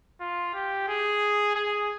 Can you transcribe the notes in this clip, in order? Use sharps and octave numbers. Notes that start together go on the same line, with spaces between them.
F4
G4
G#4
G#4